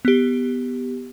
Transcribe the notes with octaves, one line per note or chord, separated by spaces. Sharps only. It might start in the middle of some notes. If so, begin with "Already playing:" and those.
B3 G4